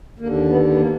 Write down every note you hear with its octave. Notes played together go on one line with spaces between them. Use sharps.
D#2 D3 A#3
B3
B3
A#3